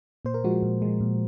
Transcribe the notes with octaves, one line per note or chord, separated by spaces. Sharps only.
A#2 C5
A#4
F3 G#3 F#4
A#2
F3 G#3
A#2